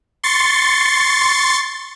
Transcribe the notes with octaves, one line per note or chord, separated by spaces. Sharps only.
C6 C#6 A6